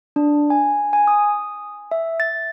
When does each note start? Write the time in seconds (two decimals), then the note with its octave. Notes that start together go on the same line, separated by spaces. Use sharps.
0.16 D4
0.50 G#5
0.93 G#5
1.08 D#6
1.91 E5
2.20 A6